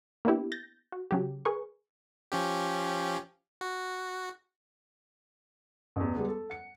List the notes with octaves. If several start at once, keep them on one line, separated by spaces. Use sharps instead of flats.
A#3 B3 D4 E4 G4
G6 A6 A#6
F#4
C#3 F#3 G4
G#4 A#4 B4 C#6
F3 C#4 G4
F#4
A1 E2
G3 G#3 B3
A4
F#5 C#7